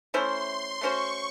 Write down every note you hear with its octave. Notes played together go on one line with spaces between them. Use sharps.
A3 C#4 E4 C5 C6
C6
A3 C#4 F#4 C5 C#6